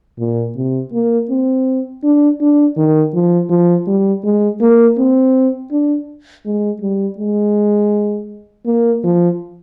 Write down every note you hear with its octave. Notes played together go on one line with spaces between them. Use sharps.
A#2
C3
A#3
C4
D4
D4
D#3
F3
F3
G3
G#3
A#3
C4
D4
G#3
G3
G#3
A#3
F3